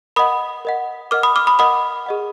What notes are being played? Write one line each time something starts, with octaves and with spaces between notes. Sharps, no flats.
A#4 D#5 F#5 B5 D#6
A#4 D#5 F#5
A#4 D#5 F#5 D6 F6
B5 D#6
D6 F6
B5 D#6
A#4 D#5 F#5 B5 D#6
G#4 D#5 F#5